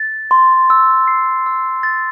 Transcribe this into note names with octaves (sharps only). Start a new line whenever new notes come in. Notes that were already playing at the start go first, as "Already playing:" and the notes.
Already playing: A6
C6
E6
C7
E6
A6